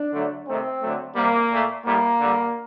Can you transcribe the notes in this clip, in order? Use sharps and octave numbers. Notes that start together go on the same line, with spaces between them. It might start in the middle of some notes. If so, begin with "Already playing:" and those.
Already playing: D4
D3 F#3 A3
C3 D#3 A3 C4
D3 F#3 A3
C3 G3 A#3
A#2 A3
A2 G3 A#3
D3 G3